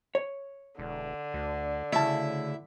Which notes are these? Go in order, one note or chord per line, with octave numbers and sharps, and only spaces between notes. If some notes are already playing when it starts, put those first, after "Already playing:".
C#5
E1 D3
D2
D2 C#3 E4 A5